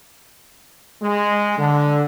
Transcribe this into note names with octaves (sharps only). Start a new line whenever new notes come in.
G#3
D3